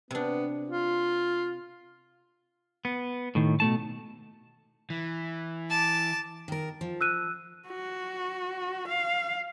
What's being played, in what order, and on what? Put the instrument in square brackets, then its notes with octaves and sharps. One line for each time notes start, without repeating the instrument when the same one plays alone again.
[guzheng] C3 D4 [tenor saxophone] B3
[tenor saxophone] F4
[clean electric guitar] B3
A2 D#3
B2 A3 A5
[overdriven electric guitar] E3
[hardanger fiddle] A5 D6
[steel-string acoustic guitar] D#3 A#4
F3
[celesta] E6 F#6 D#7
[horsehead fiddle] F#4
F5